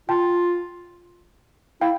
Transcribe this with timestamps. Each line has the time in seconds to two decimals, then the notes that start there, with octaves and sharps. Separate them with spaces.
0.09 F4 G5 A5
1.81 E4 F5 G5